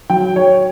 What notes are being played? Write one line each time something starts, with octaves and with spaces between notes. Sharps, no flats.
F#3 G5
C#5